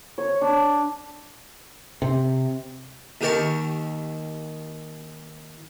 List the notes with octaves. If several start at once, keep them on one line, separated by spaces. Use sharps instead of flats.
C#5
D4
C3
D#2 D#3 G4 A#4 A5 C#6